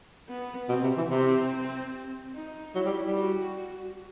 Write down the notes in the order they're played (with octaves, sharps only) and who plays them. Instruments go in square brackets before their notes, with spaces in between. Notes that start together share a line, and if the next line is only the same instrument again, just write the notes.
[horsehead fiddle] B3
[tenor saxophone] B2 [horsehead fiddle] C4
[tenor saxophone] C3
E3
[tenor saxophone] C3 [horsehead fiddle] C4
[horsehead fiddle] D#4
[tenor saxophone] F#3 [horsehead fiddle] E4
[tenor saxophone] G3
G3
[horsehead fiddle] F#4